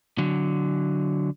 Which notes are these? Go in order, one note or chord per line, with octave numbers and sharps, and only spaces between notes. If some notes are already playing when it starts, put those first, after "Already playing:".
D3 F#3